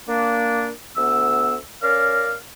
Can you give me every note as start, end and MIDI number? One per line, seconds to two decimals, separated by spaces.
0.09 0.70 58
0.09 0.70 62
0.96 1.56 38
0.96 1.56 59
0.96 1.56 88
1.83 2.33 61
1.83 2.33 70
1.83 2.33 74
1.83 2.33 77